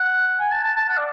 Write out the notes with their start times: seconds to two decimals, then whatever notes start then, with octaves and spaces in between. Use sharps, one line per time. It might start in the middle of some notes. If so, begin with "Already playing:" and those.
Already playing: F#5
0.40 G#5
0.52 A5
0.64 A5
0.77 A5
0.89 F#5
0.98 D5